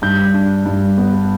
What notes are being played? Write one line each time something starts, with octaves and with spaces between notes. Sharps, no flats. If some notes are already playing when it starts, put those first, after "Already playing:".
G2 G6
D4
G2
B3